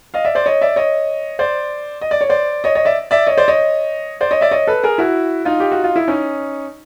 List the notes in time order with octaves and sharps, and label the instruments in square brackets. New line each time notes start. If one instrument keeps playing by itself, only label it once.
[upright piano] D#5 F5
D5 E5
C5 D5
C#5 D#5
D5 E5
C#5 D#5
C5 D5
D#5
D5
C#5
C5 D5
C#5 D#5
C#5 D#5
D5 E5
D5 E5
C#5 D#5
C5 D5
C#5 D#5
C5 D5
C#5 D#5
D5 E5
C#5 D#5
A4 B4
G#4 A#4
E4 F#4
D#4 F4
G4
F#4
F4
E4
C#4 D#4